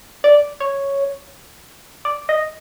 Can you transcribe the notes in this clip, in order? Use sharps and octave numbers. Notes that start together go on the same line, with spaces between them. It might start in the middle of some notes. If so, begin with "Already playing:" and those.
D5
C#5
D5
D#5